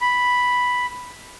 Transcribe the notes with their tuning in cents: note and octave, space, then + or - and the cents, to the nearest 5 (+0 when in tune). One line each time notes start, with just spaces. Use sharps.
B5 +0